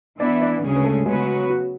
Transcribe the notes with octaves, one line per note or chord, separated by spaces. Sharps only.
E3 B3 D4 E4 D5
D4 D5
D2 C#3 G#3 C#4 G#4
B4
A3 A4
C#3 F#3 G#3 B3 F#4 G#4 B4
F#4